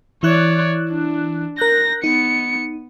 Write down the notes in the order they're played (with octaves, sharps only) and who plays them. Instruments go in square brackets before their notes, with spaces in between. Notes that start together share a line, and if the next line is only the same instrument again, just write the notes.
[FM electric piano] E3 E4 F#6 [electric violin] C#5 D5
[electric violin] D4
[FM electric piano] A#4 F#6 G6 [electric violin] A#6
[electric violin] B3 C#7 [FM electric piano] D#4